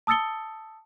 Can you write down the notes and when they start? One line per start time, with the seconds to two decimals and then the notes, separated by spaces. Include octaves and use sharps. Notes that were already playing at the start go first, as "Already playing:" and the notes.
0.07 A5 D#6 E6 A6 C#7 G7